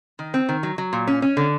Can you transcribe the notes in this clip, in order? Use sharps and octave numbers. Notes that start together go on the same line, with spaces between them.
D#3
C4
D#3
F#3
F#3
A#2
C#4
C#4
D3